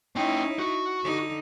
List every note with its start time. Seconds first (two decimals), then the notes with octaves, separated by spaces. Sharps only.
0.16 C#4 D#4 E4 G5
0.59 F#4
1.04 D3 D#4